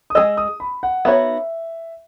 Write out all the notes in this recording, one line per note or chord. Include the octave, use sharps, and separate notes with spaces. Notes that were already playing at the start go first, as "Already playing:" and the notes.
D#6
G#3 C#4 G#4 D#5 E6
D#6
B5
F#5
B3 D#4 F#4 C#5 E5